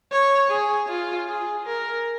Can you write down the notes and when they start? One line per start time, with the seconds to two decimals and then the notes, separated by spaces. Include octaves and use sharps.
0.12 C#5
0.51 G#4
0.89 F4
1.28 G#4
1.66 A#4